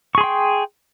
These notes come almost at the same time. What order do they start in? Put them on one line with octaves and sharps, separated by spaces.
C#6 G#4 C6 G5